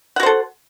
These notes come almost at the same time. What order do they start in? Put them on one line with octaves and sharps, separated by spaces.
F#5 F#4 C5 A4